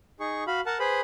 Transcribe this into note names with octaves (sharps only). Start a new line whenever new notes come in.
D#4 G#4 C#6
F#4 F5 B5
A#4 F#5 A5
G#4 B4 C5 B5